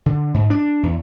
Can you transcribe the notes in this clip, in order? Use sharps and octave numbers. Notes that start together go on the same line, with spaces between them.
D3
G#2
D4
E2